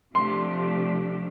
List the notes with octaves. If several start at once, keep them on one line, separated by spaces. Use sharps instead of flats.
C3 F3 A3 D4 G4 C6